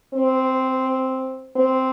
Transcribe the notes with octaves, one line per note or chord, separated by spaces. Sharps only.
C4
C4